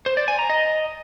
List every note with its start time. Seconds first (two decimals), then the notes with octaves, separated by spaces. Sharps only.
0.06 C5
0.17 D5
0.28 G#5
0.39 A#5
0.50 D#5